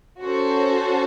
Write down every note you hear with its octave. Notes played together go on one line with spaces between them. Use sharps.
C#4 F#4 A4 C5